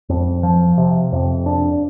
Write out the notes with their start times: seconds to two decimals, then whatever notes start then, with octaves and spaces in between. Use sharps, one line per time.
0.09 F2
0.43 F3
0.78 C3
1.12 F2
1.46 D4